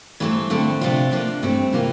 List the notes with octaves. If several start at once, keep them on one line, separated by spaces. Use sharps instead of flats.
G2 E3 A3 C4
F2 D3 A3 C4
C3 F3 A3 D4 F4
D2 C3 F3 A#3 D4
G2 E3 A3 C4
C3 E3 A#3 F4